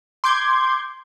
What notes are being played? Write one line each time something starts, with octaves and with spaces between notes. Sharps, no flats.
C6 D6 G6 G#6